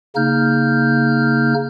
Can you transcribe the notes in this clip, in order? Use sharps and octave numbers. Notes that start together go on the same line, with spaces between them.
C#3 A#3 D#4 F6 G6